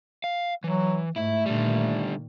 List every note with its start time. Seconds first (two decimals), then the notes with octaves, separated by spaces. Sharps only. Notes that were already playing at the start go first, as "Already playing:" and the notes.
0.24 F5
0.64 E3 F#3
1.16 G#2 A3 E4 E5
1.46 A#2 D3 D#3 G3